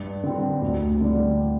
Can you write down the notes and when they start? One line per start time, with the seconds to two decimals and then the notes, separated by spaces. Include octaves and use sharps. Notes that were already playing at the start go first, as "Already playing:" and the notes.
Already playing: G2
0.23 D3 G3 C4
0.62 D2
1.01 D3 G3